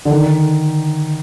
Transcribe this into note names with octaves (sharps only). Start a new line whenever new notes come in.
D3
D#3